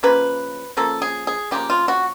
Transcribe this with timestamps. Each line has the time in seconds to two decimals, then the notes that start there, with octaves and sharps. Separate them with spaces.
0.03 C#3 F3 A#3 B4
0.77 C#3 F3 A#3 A4
1.02 G#4
1.27 G#4
1.51 C#3 F3 A#3 G4
1.70 F4
1.88 F#4